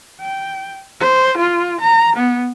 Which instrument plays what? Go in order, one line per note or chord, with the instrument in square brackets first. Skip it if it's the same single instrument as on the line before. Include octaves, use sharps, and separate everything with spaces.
[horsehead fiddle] G5
C5
F4
A#5
B3